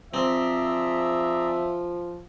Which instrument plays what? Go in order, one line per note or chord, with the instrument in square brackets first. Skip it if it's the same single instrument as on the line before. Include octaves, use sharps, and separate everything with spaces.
[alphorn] F3 [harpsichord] C4 [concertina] G#4 D5 A#5 [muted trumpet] E5